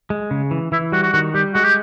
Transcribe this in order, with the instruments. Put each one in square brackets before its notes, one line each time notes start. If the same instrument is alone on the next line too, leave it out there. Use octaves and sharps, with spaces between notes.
[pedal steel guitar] G#3
C#3
E3
[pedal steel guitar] E3 [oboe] E4
[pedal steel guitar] G3 [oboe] F#4
[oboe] F#4
[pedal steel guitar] D#3 [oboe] F#4
[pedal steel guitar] G3 [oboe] G4
[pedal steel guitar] G#3 [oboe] F#4
[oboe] G4